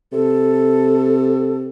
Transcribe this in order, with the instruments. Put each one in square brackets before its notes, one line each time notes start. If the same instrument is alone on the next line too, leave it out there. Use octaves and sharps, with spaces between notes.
[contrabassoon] C3 [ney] A4